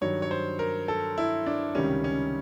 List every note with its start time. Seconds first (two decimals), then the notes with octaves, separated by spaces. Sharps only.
0.01 G2 D#3 F#3 C#5
0.22 C#5
0.31 C5
0.59 A#4
0.88 A4
1.18 E4
1.46 D4
1.75 C#2 C3 D#3 G3 C#4
2.04 C#4